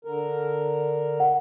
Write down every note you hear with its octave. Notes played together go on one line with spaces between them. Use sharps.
D3 A#4
F#5